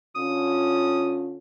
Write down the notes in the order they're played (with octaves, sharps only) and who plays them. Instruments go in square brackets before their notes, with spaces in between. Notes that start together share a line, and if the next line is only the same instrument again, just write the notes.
[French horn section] D3 C#4 F4 [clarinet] D#6